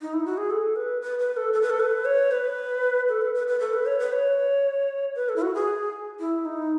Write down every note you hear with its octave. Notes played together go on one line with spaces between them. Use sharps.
D#4
E4
F#4
G#4
A4
B4
B4
B4
A4
A4
B4
A4
B4
C#5
B4
A4
B4
B4
B4
A4
B4
C#5
B4
C#5
B4
A4
E4
F#4
G#4
E4
D#4